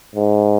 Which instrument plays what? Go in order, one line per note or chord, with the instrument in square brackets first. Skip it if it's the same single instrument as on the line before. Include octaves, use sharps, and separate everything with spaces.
[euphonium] G#2